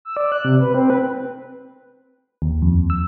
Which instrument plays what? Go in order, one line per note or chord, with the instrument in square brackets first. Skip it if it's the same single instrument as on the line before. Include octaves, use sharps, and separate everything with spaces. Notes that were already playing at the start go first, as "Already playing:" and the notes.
[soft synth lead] E6
D5
F#6
C3
B4
C4
B4
[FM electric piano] D#2
F2
E6